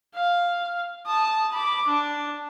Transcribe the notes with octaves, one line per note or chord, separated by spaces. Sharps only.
F5
A5 D#6
B5 D6
D4